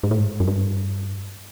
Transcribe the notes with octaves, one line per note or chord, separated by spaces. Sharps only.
G#2
A2
G#2
F#2
G2